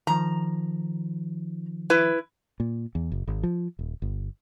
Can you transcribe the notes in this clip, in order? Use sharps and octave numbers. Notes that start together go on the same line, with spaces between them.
D#3 F3 A#5
E4 B4
A#2
E2
F#1
G#1
F3
D#1
G1